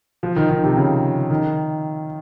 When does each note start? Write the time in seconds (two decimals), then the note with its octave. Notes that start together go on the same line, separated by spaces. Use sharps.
0.23 F3
0.36 D#3
0.49 D#3
0.64 C3
0.77 C#3
1.30 D#3